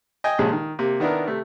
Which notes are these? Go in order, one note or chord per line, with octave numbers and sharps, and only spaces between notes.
D#5 G5 G#5
A#1 D#2 A#2 C#3 G#3
D#3
C3 A#3
D#3 B3 D4 E4 A#4
C3 A3